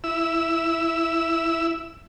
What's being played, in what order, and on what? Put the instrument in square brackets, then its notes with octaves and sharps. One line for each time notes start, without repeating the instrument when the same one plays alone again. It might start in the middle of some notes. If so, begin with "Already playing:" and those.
[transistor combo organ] E4 E6